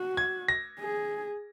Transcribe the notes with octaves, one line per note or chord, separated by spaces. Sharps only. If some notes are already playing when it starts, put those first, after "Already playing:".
Already playing: F#4
G#6
A#6
G#4